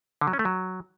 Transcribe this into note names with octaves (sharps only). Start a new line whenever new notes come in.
D3
F#3
C#4
A3
F#3